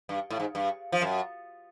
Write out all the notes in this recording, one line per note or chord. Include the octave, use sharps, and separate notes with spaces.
G2
A2
G#2
G2
F3
F#2